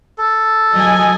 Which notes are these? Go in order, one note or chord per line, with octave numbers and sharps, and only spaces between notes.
A4
F#3 D#5 G#5